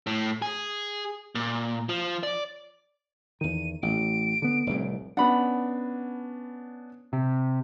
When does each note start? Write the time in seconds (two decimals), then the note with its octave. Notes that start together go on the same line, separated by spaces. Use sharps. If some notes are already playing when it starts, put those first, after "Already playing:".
0.07 A2
0.42 G#4
1.35 A#2
1.89 F3
2.23 D5
3.41 E2 D#3 D#7
3.83 A1 D7
4.42 D3 B3
4.67 F1 C2 A2
5.17 B3 C#4 D4 F#5 B5
7.13 C3